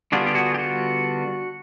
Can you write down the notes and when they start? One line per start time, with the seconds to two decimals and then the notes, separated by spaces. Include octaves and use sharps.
0.12 D3 G3 B3 D4 F4 F#4 G#4
0.27 G4
0.35 F#4 G#4
0.54 G4
0.58 F#4